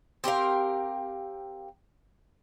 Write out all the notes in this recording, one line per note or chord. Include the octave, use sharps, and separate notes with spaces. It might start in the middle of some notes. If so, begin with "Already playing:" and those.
C4 G4 A#4 F5